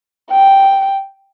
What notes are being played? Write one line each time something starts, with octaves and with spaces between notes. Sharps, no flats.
G5